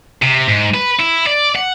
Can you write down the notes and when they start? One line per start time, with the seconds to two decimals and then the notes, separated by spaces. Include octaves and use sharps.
0.22 C3
0.48 G#2
0.74 B4
0.99 E4
1.27 D5
1.55 F#5